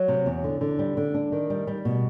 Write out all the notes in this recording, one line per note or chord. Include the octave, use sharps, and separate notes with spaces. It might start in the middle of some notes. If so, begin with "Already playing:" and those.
Already playing: F#3
C3
E2
D3
D3
G3
D3
D4
D#3
G3
G3
B2